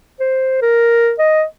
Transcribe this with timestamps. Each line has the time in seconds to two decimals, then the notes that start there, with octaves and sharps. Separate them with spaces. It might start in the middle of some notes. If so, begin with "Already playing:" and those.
0.20 C5
0.62 A#4
1.19 D#5